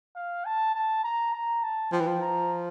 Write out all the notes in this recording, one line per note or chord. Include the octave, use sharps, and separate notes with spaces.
F5
A5
A5
A#5
A#5
A5
F3 G5
E3
F3
A#5